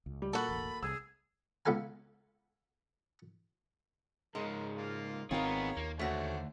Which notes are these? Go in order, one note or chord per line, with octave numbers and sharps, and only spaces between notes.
C#2
G3
A#2 A#3 F#4 A4 B5
E1 A1
C2 G#4 E6
C#2 B3 A4 F5 G#5
G#2 C#3 G#3 A#4
A#3 F4
G#1 D#3 B3 C4 F4 G#4 A#4 C#5
D#2 A#3
D2 A3 C#4 D4 F#4 C5